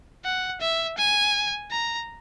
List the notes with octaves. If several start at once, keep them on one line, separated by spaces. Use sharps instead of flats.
F#5
E5
G#5
A#5